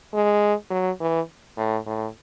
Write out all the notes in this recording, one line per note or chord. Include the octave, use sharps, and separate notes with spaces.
G#3
F#3
E3
A2
A2